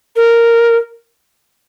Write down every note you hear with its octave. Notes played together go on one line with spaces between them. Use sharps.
A#4